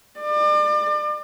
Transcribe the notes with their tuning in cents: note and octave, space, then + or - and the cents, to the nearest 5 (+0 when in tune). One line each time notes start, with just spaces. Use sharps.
D5 +35